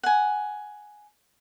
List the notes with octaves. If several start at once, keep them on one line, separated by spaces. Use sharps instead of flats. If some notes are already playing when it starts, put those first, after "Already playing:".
F#5 G#5